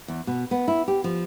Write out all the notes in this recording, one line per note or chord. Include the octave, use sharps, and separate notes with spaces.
E2
B2
B3
E4
G4
F3